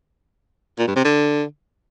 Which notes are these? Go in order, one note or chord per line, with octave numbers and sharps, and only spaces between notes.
A#2
G2
C3
D3